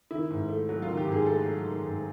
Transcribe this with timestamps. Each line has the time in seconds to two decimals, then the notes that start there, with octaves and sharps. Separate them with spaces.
0.11 D#3 E4
0.30 G#2
0.49 A3
0.69 F#3
0.82 F4
0.88 D#3
0.97 G4
1.07 G#2
1.12 G#4
1.26 A3 A4
1.45 F#3
1.65 D#3
1.84 G#2